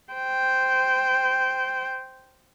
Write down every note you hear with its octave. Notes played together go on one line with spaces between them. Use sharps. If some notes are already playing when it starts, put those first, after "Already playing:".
C5 G5